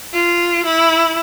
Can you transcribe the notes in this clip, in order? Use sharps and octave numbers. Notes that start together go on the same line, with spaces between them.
F4
E4